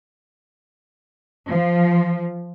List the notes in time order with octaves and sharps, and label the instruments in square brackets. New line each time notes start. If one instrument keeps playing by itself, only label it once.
[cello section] F3